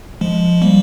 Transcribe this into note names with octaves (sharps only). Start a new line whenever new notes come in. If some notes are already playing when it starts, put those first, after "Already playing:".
F3 G#3
G3 A#3